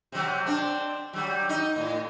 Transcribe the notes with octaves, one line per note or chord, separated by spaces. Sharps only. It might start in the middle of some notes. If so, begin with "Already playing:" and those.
C3 F#3
C4 D4
F#3 G3
D#4
A2